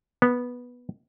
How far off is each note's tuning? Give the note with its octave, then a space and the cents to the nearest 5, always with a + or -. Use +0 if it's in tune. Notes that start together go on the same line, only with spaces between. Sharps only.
B3 -10